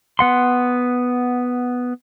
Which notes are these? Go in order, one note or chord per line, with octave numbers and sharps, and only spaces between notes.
B3 F#5 C6